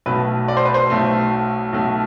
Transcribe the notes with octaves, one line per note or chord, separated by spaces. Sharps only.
B1 B2 A3 B4
D5
C5
B4
C5
B1 B2 A3
B1 B2 A3